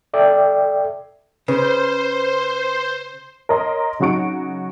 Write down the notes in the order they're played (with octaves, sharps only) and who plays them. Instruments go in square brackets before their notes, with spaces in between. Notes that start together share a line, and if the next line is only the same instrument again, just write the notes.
[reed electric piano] A4 D5 E5 G5
[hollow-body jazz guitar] C#3 [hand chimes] B4 [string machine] C5
[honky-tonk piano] A#4 C#5 D#5 A#5 C6
C#3 F#3 D#4 F#4 C#6 D7